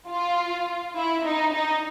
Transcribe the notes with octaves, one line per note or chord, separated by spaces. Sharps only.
F4
E4
D#4
D#4